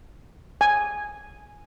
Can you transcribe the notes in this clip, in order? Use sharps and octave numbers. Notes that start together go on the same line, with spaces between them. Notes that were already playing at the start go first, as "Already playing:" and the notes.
G#5